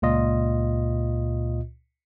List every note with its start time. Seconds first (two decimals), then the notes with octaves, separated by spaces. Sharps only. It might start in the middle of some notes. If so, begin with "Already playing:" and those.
0.02 C#2 A#2 F4 D#5